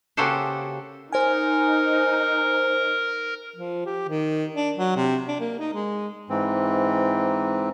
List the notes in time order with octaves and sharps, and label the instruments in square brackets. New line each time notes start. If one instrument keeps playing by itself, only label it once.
[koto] C#3 A#3 F#4 G4 A4 C5
[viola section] D#4 [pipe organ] A#4 [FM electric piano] C5 G#5
[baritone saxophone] F3
G4
D#3
D4
F#3
C3
D4
A#3
D#4
G#3
[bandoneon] G#2 E3 C4